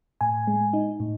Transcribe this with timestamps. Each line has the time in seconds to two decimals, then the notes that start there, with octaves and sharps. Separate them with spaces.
0.21 A2 G#5
0.47 G#3
0.73 D#4
1.00 A2